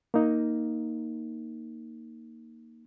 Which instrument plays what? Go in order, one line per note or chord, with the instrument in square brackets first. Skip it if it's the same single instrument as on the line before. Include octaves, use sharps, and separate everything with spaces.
[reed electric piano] A#3 D#4